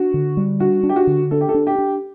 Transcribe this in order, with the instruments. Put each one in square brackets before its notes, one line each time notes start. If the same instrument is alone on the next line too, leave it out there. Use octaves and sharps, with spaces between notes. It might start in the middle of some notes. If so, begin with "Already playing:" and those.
Already playing: [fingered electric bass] D4 [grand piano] F#4
[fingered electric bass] D3
G3
[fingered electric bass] D4 [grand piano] F#4
[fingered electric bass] D4
[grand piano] G4
F#4
[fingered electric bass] D3
[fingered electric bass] D4 [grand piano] A4
[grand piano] G4
A4
[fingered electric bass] D4
[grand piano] G4
[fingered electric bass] D4